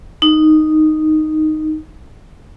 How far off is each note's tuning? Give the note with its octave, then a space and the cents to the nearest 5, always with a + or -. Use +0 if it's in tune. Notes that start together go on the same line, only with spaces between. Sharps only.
D#4 -5